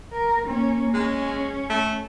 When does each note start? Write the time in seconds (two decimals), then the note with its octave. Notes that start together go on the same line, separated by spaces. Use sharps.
0.13 A#4
0.48 A#3 C#4
0.94 G#3 C#4
1.70 A3